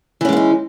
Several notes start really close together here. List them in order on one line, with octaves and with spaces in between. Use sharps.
E3 C#4 G#3 B3 D#4